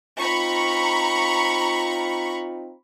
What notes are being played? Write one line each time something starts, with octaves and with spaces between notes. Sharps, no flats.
C4 D#4 F4 A#5 B5 C#6